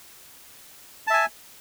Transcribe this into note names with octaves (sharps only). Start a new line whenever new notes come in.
E5 G#5 A5